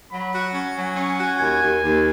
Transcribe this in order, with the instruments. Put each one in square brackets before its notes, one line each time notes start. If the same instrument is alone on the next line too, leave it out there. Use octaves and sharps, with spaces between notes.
[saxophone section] F#3 [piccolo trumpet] B5
[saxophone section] F#4
C#4
[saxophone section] F#3 [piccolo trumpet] G#5
[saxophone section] C#4
F#4
[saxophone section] D#2 [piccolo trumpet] G#5
[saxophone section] D#2
D#2